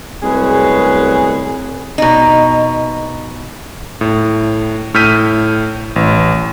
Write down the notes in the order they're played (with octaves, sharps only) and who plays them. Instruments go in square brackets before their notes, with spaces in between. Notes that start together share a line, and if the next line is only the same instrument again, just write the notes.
[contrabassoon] C2 [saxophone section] F#2 G#3 G#4 [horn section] A3 B4 C#5
[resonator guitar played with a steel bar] B2 D#4
[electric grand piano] A2
A2 E6 F6 G6 B6 D#7
A1